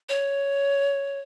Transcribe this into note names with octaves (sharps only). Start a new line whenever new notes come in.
C#5